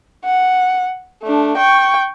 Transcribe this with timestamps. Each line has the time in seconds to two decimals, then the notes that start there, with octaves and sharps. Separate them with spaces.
0.24 F#5
1.23 A3 D4
1.57 G5 C#6